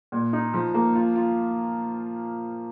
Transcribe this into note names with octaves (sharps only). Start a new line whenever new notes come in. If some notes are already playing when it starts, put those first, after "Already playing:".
A#2
D#4
F3
A#3
F4
F4